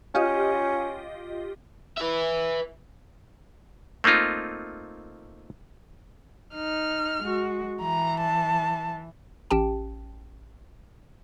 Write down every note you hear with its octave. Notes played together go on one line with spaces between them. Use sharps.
C#4 F4 G4 D#5
B4 E5
A3 A#3 C4 D#4 F4
D#4 F6
G#3 F#4
E3 A#5
A5
A1 C#4 G4 G5 A5